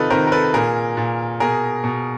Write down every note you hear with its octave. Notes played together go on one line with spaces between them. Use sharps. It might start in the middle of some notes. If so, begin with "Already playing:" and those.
Already playing: C3 D#3 D#4 F4 A4 B4
C3 D#3 A#4 C5
A#4
A4 B4
A#2 G#4 A#4
A#2
B2 G#4 A#4
B2